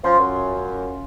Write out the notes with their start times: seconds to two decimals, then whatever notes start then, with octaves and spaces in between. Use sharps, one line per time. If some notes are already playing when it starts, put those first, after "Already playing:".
0.04 F3 C#4 F4 C6
0.19 F#2